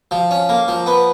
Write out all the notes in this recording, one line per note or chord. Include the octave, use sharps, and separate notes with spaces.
F3
C#4
A#3
F3
B3